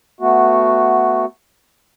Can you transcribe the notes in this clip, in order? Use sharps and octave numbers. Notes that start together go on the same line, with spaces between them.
A3 B3 F#4